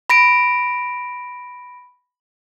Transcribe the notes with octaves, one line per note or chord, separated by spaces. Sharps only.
B5 A#6 D7